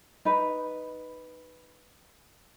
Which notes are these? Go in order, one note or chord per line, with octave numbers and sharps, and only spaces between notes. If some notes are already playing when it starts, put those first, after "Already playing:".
D#4 B4